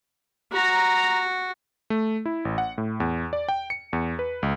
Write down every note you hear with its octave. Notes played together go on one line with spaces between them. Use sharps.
F#4 A#5
A3
E4
A1
F#5
A2
E2
D5
G5
C#7
E2
B4
C#2